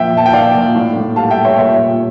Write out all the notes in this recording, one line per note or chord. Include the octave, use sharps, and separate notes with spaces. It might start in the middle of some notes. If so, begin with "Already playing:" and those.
Already playing: A#2 F3 E5 G5
A#2 A5
G5
A#2 D5 F5
A#2
A2
A2
G3 F5 A5
E5 G5
G3
C#5 E5
A#2 C#5 E5
A#2